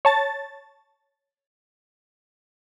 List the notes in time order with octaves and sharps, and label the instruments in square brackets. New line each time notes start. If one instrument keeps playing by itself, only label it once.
[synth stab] C#5 A5 A6